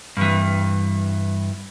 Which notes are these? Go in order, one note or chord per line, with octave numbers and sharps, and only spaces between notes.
G2 E3